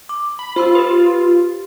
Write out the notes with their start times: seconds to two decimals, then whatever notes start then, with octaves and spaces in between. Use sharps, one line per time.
0.09 D6
0.39 B5
0.56 F4 C5 B5 E6
0.75 G4 B4